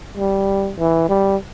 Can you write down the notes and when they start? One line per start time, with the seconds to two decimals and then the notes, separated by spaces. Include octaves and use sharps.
0.17 G3
0.78 E3
1.09 G3